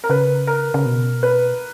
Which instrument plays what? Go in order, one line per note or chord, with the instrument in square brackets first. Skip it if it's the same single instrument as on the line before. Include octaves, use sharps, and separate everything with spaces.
[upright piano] A#4
[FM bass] C#3 [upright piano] B4
[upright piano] A#4
[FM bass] C#3
B2
[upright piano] B4